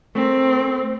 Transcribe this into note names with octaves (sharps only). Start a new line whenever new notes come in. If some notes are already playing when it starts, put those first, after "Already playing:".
A3 C4 A#4